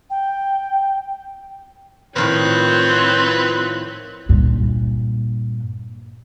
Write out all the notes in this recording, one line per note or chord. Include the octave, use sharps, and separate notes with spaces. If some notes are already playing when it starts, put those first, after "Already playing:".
G5
A2 D#3 F3 C4 B4 C#5 F#6
G2 A#2